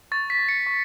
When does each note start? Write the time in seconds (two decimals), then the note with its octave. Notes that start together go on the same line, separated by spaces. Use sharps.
0.12 C#6 A6
0.30 B6
0.39 C#6
0.49 C#7
0.66 C#6